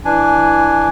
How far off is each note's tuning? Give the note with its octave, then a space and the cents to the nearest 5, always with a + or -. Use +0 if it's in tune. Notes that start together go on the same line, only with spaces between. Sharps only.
E3 +0 D4 +10 G#5 +0